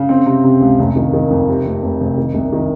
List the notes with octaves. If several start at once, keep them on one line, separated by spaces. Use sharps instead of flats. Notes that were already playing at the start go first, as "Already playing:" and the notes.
Already playing: C#3
C4
C3
C3
C#2
F1
D#3
D#3
F2
C3
F1
F1
F1
D#3
C2
D#3